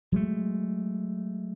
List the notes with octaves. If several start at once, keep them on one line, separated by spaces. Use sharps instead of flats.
F#3 G#3 A3